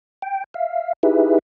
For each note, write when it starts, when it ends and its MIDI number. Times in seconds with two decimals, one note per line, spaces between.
0.22 0.44 79
0.54 0.93 76
0.54 0.93 77
1.03 1.39 63
1.03 1.39 64
1.03 1.39 67
1.03 1.39 68
1.03 1.39 71
1.03 1.39 76